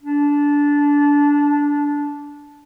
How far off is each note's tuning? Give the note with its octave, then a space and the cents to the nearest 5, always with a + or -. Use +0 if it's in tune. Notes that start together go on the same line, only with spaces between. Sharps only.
D4 -15